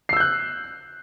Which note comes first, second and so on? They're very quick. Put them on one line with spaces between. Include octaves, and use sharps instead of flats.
C7 E6 G6 F#6